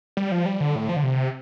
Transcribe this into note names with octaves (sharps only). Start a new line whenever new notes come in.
G3
F3
G3
D3
A2
F3
D3
C3